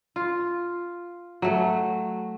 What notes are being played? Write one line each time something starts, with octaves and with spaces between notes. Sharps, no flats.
F4
F#3 A3